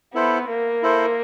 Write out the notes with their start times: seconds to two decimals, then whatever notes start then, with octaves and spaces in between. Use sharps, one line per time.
0.14 B3 E4 A4 C5
0.49 A#3
0.82 E4 A4 C5